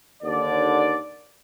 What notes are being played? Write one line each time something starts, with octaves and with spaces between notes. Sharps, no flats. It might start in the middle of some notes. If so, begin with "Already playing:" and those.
D#2 D3 D5